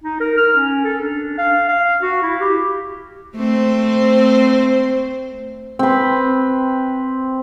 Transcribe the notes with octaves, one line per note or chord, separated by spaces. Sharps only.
D#4
A#4
F6
C#4
A4
D4
F5
F5
F#4
E4
G4
A3 C4 C5
C4 B4